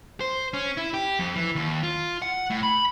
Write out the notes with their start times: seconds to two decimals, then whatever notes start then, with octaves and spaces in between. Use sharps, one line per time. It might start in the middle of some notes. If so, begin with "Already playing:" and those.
0.20 C5
0.53 C#4
0.77 E4
0.94 G4
1.19 F2
1.36 E3
1.55 D#2
1.83 F4
2.22 F#5
2.50 A2
2.63 B5